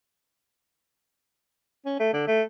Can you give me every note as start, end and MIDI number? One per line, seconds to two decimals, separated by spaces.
1.86 1.97 61
2.00 2.12 57
2.13 2.27 50
2.28 2.42 57